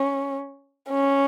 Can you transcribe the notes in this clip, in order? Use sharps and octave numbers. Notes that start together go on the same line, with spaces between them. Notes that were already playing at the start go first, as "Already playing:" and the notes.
Already playing: C#4
C#4